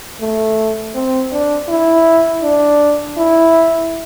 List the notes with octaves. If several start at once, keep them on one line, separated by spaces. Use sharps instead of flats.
A3
C4
D4
E4
D4
E4